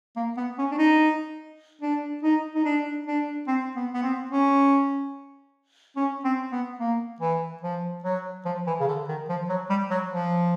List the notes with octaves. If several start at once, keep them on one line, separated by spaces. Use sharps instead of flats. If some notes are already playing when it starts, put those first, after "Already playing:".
A#3
B3
C#4
D4
D#4
D4
D#4
D#4
D4
D4
C4
B3
B3
C4
C#4
C#4
C4
B3
A#3
E3
F3
F#3
F3
E3
C#3
D3
D#3
F3
F#3
G3
F#3
F3